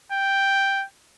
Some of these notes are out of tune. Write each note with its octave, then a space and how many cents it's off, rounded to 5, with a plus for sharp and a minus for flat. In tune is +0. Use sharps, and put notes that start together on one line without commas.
G5 +0